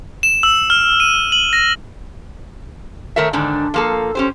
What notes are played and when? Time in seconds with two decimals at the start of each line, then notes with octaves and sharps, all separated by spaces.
0.23 E7
0.43 E6
0.70 F6
1.00 D#7
1.32 F#7
1.53 A#6
3.16 D#3 A3 A#4 C#5 E5
3.33 G#2 D3 D#3 D4
3.74 F3 A#3 A4
4.15 C#4 G4 C5